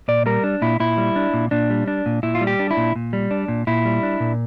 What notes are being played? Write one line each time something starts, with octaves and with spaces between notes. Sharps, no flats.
A#2 D5
G3 A#4
D4
A#2 E4
A#2 E4
G3
D4
A#2
A#2 D4
G3
D4
A#2
A#2 E4
F4
G3
G4
D4
E4
A#2
A#2
G3
D4
A#2
A#2 E4
G3
D4
A#2